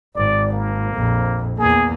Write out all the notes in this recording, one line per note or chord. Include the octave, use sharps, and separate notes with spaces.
G#1 D5
A#3
A#1 F2
E2 A#3 G#4